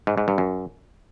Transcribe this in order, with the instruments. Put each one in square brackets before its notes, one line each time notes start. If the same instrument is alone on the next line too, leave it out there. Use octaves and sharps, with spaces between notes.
[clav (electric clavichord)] G#2
G#2
G2
F#2